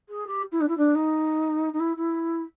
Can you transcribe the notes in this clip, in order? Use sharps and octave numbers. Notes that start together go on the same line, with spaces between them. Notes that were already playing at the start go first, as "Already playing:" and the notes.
G#4
G4
E4
D4
E4
D4
D#4
D#4
E4
E4